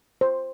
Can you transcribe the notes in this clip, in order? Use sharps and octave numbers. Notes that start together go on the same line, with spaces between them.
C5